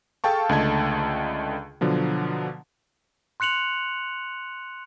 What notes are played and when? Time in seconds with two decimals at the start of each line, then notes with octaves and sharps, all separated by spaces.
0.24 G#4 A4 F5 G5 A5 C#6
0.49 C#2 D3 A3 D#5 A5 G#6
1.81 B2 D3 F3 F#3
3.40 C6 F#6 C#7 F7 F#7